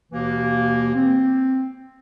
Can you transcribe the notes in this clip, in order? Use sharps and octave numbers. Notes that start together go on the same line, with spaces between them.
D#2 B2 E3 A#3
C4